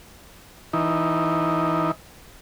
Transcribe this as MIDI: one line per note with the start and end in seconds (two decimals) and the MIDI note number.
0.73 1.91 52
0.73 1.91 63